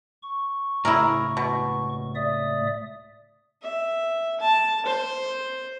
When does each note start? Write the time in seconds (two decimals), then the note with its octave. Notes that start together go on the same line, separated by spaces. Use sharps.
0.23 C#6
0.85 C#2 A2 E4 G#4 A#4
1.37 B2
2.15 D5 E5 D#6
3.62 E5
4.40 A5
4.86 C5